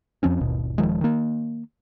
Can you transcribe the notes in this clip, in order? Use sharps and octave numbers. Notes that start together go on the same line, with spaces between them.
F2 F3 C4 C#4
G#1 D#2 B2
D#1 D#3 F3 G#3
D#3 A#3